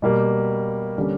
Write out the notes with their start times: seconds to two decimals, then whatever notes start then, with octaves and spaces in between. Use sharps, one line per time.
0.02 B2 G3 A#3
0.98 D3 G3 A#3 C#4